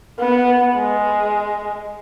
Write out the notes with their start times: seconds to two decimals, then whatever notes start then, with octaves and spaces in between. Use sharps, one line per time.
0.19 B3
0.75 G#3